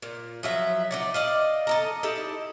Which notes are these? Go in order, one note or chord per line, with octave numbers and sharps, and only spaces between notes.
A#2
F3 F#3 E5
D#4 D5 F#5
D5 D#5 F5
A4 D#5 A#5
D#4 E4 G4 A4